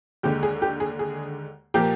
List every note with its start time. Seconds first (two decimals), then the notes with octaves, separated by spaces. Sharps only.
0.23 D#2 D3 G#3 G4
0.43 G#4
0.62 G4
0.80 G#4
0.99 G#4
1.74 A#2 F3 A#3 G4